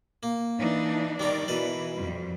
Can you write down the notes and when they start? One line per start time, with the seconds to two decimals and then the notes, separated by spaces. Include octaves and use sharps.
0.23 A#3
0.58 E3 D4 D#4
1.20 D#3 G3 C4 D5 A#5
1.48 B2 E3 A#4 B4
1.96 F2 G3